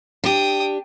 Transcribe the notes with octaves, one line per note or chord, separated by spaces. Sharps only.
D4 G4 G5 D#6